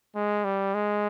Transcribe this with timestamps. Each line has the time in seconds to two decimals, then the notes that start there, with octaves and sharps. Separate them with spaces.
0.15 G#3
0.44 G3
0.74 G#3